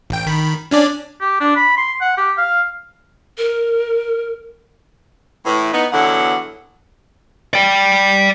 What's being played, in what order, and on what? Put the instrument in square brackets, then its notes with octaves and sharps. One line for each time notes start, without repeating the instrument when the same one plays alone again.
[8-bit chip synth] A1 G5
D#3 B5
C#4 D4 D5
[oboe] G4
D4
B5
C6
F#5
G4
F5
[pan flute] A#4
[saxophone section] A2 E3
B3 D#4
E2 B2 D3 F#3 E4 F#5
[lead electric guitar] D5 G5